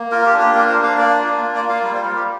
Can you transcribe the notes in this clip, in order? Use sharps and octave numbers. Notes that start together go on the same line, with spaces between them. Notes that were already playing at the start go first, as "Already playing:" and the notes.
Already playing: A#3
F4 A#4
G4
D4
G4
A#3 A#4
C5
D4
F5
A#3 D5
F4
A#3
D5
F4
F5
G3 D5
C5
G3 A#4
G4